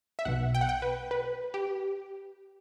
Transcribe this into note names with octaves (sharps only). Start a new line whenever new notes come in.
E5
B1 B2 F#5
G5
F#5
G5
B4
B4
G4